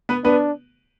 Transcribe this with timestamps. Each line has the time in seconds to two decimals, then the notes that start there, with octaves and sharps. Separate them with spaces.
0.09 B3 B4
0.24 B3 D4 B4